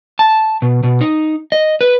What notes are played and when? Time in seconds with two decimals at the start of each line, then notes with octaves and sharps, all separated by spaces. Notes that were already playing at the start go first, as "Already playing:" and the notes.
0.19 A5
0.62 B2
0.83 B2
1.01 D#4
1.52 D#5
1.81 B4